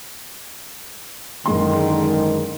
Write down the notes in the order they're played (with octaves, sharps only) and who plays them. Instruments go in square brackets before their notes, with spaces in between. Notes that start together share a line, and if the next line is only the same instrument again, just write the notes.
[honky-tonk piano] F#1 G#3 C6 [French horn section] G#2 D3 D#3